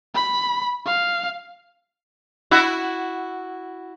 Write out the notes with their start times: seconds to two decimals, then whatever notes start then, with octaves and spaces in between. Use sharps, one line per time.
0.15 B5
0.85 F5
2.51 E4 F#4